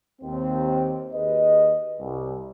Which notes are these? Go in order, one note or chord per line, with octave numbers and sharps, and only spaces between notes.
D#2 C4
D#2 G#4 B4 D#5
C2